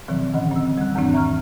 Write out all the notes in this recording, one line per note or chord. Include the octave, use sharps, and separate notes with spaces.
B2 D#3 F3 F#3 C4
A2 D3 E3 C#4 D#5 F#5
C4 E6
G3 F#6
E2 G#2 D#3 E3 C4 D4
E5 A#5 C#6 F6